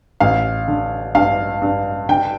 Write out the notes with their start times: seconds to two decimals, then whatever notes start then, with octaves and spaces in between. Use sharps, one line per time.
0.20 A1 F5
0.68 D3
1.15 G2 F5
1.62 G2
2.09 D3 G5